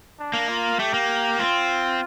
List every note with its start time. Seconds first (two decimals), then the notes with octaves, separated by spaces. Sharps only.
0.19 D4
0.34 A#3
0.49 F4
0.79 A3 G4
0.94 A#3
1.39 C4 F4